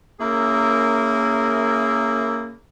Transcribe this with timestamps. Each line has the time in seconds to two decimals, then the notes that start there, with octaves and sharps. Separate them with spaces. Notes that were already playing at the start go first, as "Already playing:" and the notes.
0.20 A#3 C#4 E4 G#4 A#4